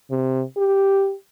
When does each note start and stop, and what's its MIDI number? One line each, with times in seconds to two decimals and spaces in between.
0.11 0.42 48
0.57 1.14 67